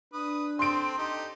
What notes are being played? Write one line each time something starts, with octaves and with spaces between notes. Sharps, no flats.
D4 B4 D#6
C4 A4 C6 D7
D#4 G4 A4